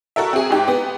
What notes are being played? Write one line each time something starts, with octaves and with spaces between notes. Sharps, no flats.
F#4 A4 A#4 E5
C4 G#4
G#2 D#4 G4
B3